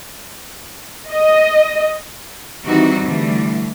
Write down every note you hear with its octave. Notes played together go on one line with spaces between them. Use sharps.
D#5
D#3 E3 G3 C4 D#4 F#4
D3 E3 G3 A3